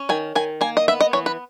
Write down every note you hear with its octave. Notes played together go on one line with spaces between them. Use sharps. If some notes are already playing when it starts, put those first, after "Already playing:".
Already playing: C#4
D#3 G#5
D#3 G#5
A#3 G#5
D#5
B3 E5
D#5
E3 C#5
B4